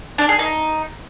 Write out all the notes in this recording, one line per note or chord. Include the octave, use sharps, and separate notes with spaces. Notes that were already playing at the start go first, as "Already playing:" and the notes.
D4
G#4
D#4